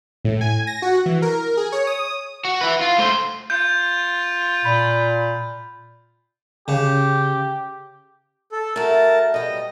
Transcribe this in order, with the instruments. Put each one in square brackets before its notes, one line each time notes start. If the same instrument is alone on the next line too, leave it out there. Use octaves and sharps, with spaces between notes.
[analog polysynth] A2
G#5
A#6
F#4
E3
A#4
G#4
C#5
D#6
[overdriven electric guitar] F#4
E4 B4
F4
A3 C5
[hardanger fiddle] F4 [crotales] G6
[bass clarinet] A#2 [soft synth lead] B5
[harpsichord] C#3 [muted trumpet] G4
[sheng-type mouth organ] A4
[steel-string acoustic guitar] A3 F#4 [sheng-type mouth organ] A#4 A5
[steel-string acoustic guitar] B2 G3 [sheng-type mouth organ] D#5